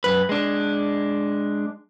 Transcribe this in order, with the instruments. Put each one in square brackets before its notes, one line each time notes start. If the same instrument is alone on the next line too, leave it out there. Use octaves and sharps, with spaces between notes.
[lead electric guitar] F#2 B4
G#3 D4